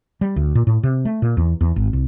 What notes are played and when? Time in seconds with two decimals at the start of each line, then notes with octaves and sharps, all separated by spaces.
0.21 G3
0.36 D2
0.55 A#2
0.67 A2
0.83 C3
1.05 A3
1.22 A#2
1.37 E2
1.61 E2
1.76 G#1
1.93 C2